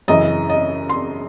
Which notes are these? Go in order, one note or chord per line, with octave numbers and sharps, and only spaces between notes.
F#2 C#3 E3 D#5
D#5
C6